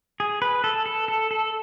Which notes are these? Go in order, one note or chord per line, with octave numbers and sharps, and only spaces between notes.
G#4
B4
A4
A4
A4
A4